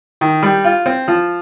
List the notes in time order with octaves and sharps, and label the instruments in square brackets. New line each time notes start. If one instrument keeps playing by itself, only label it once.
[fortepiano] D#3
G3
F4
C4
F3